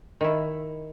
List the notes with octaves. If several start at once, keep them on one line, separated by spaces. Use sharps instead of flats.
D#3 E4